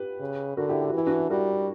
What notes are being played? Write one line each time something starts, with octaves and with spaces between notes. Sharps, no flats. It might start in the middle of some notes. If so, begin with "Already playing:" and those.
Already playing: G4 B4
C#3
D3 F#4 A#4
E4 G4
G4
F#4
E3 E4
D4 F#4
G3 F#4 A#4